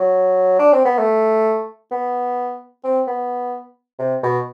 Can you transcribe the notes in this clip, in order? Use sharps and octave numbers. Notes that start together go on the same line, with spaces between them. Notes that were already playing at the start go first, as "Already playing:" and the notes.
Already playing: F#3
D4
C4
B3
A3
B3
C4
B3
C3
B2